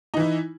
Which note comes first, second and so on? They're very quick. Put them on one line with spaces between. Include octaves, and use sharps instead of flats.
D#4 E3 E4